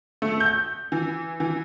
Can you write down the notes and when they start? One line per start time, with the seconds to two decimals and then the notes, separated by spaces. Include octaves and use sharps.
0.22 A3
0.40 G6
0.92 E3
1.40 E3